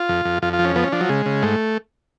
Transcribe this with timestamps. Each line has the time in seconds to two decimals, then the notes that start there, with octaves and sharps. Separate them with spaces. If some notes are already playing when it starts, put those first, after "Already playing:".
Already playing: F4
0.09 F2
0.25 F2
0.42 F2 F4
0.53 F4
0.59 F3
0.65 C#4
0.76 F3 B3
0.84 C#4
0.92 F3 D4
1.01 F#3
1.09 C#3 G#3
1.26 C#3
1.42 G#2 A3